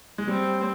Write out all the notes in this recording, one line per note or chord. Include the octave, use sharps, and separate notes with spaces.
G#3
G3 C4